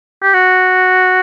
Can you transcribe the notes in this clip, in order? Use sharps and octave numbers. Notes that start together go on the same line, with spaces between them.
G4
F#4